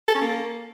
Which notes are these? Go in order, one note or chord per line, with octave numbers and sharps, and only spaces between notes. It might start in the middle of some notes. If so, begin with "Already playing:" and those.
A4
C#4
A#3